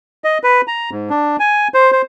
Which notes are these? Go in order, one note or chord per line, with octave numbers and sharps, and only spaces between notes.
D#5
B4
A#5
G#2
D4
G#5
C5
C5